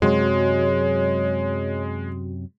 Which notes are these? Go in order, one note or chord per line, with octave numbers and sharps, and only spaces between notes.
F#2 C3 F#3 G#3 F#4 C#5 C6